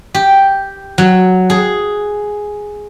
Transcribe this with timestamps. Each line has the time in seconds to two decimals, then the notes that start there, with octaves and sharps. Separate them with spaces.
0.14 G4
0.98 F#3
1.50 G#4